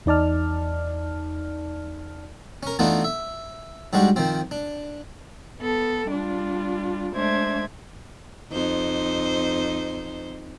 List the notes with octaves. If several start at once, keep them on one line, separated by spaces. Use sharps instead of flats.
E2 D#4 D5 A5 F6
C#4 A#4
E3 A3 B3 D4 D#4 F4
E5
G#2 G3 G#3 D4 F#4
D#3 F3 C4
D4
B3 A4
G3 D4 F4
G#3 A3 D4 C5 E5 G#6
F2 D#4 C5